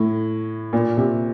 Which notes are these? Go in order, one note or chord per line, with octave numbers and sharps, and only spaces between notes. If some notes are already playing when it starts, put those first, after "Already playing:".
Already playing: A2
A#2
C3